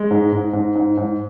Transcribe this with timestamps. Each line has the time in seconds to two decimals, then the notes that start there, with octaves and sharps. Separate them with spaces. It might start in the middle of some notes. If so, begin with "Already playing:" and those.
Already playing: G#3
0.11 G#2
0.32 G#2
0.53 G#2
0.75 G#2
0.97 G#2